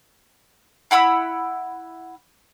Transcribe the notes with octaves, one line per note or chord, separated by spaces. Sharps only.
E4 F#5 B5 E6